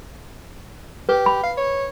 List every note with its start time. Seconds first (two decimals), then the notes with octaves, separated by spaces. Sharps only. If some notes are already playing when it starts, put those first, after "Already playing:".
1.09 G4 B4
1.26 B5
1.43 F5
1.57 C#5